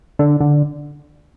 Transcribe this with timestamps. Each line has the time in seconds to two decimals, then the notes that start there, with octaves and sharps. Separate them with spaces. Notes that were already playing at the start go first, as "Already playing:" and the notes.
0.19 D3
0.40 D3